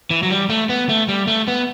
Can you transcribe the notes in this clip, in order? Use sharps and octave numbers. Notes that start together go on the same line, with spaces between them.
E3
F#3
G3
A3
B3
A3
G3
A3
B3